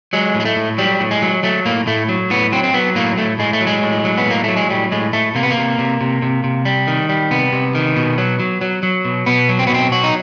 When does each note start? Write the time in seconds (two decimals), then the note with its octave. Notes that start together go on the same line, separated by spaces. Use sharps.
0.13 F#3 G#3
0.35 A2
0.40 G#3
0.45 A3
0.57 A2
0.78 F#3 G3
1.00 A2
1.11 G#3
1.22 F#3
1.43 F#3 A3
1.65 A2 A#3
1.87 A2 A3
2.09 F#3
2.30 A2 B3
2.52 F#3 C4
2.64 C4
2.74 F#3 B3
2.95 A2 A#3
3.17 A2 A3
3.39 A2 G#3
3.53 A3
3.61 F#3
3.67 G#3
3.83 A2
4.05 F#3
4.18 B3
4.26 A2 A#3
4.44 F#3 A3
4.57 G#3
4.69 A2 G3
4.91 A2 G#3
5.13 A2 A3
5.35 C3 A#3
5.43 B3
5.51 A#3
5.57 C3
5.79 C3
6.01 C3
6.22 C3
6.44 C3
6.65 G3
6.87 D#3
7.09 G3
7.31 C3 B3
7.52 C3
7.75 D#3
7.96 B2
8.18 F#3
8.40 F#3
8.61 F#3
8.83 F#3
9.05 B2
9.26 B2 B3
9.49 F#3
9.59 C4
9.67 B3
9.70 B2 C4
9.92 F#3 F#4
10.03 D#4